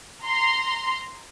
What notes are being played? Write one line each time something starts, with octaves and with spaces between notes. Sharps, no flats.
A#5 C6